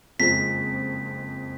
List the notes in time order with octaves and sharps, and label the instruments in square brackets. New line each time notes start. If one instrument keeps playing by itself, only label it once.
[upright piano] F#1 F2 F3 G#3 [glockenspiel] B6